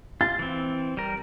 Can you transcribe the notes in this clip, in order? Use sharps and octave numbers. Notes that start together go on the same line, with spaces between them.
F4 A6
E3 C4
G3 A#4